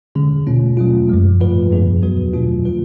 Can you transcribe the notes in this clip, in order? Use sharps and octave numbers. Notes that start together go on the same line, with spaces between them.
D3 G#3 C#4 G#4
B2 A3 C#4 F4
B2 F#3 A3 F4
F#2 F3 G#3
G#2 F3 A3 F4 B4
F#2 F3 B3 D4 G#4
F#3 B3 F#4 B4
B2 F#3 A3 D4 F4
F3 A3 F4 B4